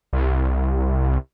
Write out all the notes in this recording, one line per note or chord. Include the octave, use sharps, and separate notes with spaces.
C2